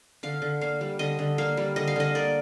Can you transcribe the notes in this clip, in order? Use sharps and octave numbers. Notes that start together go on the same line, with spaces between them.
D3 F5
D3
A#3 F5
G3
D3 D#5
D3
A#3 F5
G3
D3 D#5
F5
D3 D#5
A#3 D5